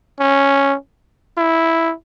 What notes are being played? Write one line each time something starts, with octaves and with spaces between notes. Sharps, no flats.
C#4
E4